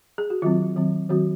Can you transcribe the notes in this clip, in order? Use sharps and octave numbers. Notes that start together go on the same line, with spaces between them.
G#4
F#4
D#3 F#3 C4 F4
D#3 F#3 C4
D#3 F#3 C4 F#4